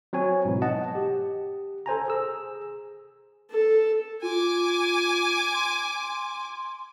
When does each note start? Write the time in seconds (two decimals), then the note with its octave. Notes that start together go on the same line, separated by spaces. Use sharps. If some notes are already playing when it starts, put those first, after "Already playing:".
0.13 F#3 C4 C#5 G#5
0.45 G#2 B2 E3
0.62 D#5 F#5 A5
0.95 G4
1.86 A4 C5 G#5 A#5
2.08 G#4 E6
3.50 A4
4.22 F4 G#5 D6
5.54 C6